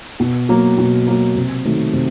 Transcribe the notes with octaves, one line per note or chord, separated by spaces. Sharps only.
B2
F#3 A#3
B2
F#3 A#3
C3
D#3 F#3 A3
C3